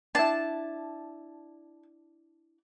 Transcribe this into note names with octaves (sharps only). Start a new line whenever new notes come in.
D4 E4 A5